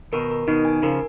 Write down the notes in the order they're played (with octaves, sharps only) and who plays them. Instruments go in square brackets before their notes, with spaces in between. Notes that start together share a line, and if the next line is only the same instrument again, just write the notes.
[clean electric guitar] B2 D#3 [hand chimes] A#4
[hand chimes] A#4
[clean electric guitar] B2 D#3 [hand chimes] D#4
[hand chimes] G#5
[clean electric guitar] C#3 F3 [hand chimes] A#4